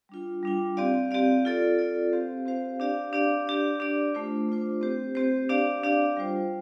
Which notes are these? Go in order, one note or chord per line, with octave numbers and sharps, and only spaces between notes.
G3 D4 F4
G3 D4 F4
C4 G4 D5 F5
C4 G4 D5 F5
F4 A4 D5
F4 A4 D5
C4 G4 C5 F5
C4 G4 C5 F5
D4 G4 D5 F5
D4 G4 D5 F5
D4 G4 D5
D4 G4 D5
A3 D4 F4 C5
A3 D4 F4 C5
C4 G4 C5
C4 G4 C5
D4 G4 D5 F5
D4 G4 D5 F5
G3 F4 C5